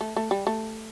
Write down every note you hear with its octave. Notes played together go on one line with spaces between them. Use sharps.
A3
A3
G3
A3